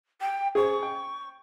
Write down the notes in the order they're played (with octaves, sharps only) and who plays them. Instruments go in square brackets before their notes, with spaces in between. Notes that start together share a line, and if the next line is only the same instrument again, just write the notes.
[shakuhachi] G5
[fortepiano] G#4 C5 [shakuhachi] C#6
[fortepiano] G5